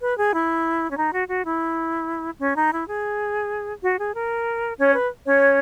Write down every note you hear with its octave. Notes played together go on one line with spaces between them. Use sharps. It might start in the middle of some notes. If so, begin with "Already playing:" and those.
B4
G#4
E4
C#4
D#4
F#4
F#4
E4
C#4
D#4
E4
G#4
F#4
G#4
A#4
C#4 C#5
B4
C#4 C#5